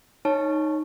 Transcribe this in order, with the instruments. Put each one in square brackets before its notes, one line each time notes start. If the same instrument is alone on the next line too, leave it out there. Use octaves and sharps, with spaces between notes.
[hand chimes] D#4 C#5 A5